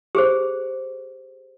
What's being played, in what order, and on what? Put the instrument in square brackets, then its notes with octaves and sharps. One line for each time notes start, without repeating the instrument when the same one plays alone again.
[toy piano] G4 G#4 C5